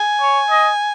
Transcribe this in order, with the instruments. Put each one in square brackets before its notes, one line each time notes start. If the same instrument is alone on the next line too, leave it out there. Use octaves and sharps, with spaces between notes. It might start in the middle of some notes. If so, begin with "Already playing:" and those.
Already playing: [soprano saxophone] G#5
[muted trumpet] C#5
D#5